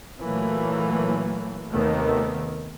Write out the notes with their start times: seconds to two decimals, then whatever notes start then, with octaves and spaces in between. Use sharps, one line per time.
0.21 A#2 E3 F#3 A3 A#3
1.73 D#2 C3 D#3 A3 B3